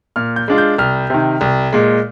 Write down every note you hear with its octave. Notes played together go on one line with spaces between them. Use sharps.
A#2 F6
G6
G#3 D4 F4
G6
C2 F6
C3 D#3
C2
A#2 G#3